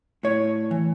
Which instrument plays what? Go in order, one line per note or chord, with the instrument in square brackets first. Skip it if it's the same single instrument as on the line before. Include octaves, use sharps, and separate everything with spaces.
[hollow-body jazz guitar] A2 C#5
E3